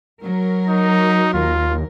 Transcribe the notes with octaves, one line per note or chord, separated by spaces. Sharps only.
F#3 A#4
D#4
D#2 F4